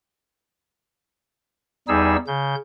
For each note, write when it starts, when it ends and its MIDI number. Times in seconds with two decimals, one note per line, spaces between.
1.88 2.16 40
1.88 2.16 55
1.88 2.16 63
1.88 2.16 68
1.88 2.16 88
2.27 2.55 49
2.27 2.55 91